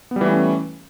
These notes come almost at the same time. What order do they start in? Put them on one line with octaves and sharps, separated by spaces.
B3 G3 E3 A3 C#4